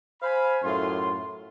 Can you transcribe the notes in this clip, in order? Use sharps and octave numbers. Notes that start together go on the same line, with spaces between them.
C5 F5 G#5 B5
F#2 A2 F4 C6